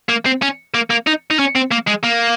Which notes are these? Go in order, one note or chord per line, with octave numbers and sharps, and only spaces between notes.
A#3
C4
C#4
A#3
A#3
D#4
D#4
C#4
C4
A#3
G#3
A#3